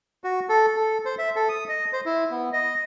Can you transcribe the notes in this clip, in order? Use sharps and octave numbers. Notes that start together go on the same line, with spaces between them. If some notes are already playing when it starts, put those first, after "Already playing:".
F#4
A4
A4
C5
E5
A4
D#6
D#5
C5
E4
B3
D#5